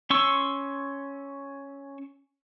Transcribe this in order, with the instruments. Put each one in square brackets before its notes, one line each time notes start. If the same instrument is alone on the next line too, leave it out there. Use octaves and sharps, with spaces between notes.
[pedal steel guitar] C#4 C6 C#6 E6